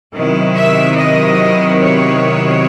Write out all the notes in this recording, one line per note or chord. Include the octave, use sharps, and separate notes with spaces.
C3 D#3 F#3 B3 E4
E5
D#5
C#5